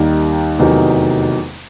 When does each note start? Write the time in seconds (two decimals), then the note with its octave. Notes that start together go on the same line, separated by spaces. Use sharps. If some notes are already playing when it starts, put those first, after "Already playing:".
Already playing: D#2 D#3 G3
0.59 F1 E2 C3 D#3 F#3